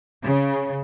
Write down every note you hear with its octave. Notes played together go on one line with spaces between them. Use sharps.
C#3